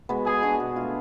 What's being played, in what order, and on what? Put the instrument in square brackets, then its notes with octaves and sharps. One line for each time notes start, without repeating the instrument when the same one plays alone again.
[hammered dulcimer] G#3 B3 F#4
[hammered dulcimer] G#3 [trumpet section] G#4
[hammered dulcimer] B3 D4 F#4
B2
A3 F4